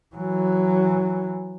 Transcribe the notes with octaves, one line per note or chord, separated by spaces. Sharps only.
E3 F#3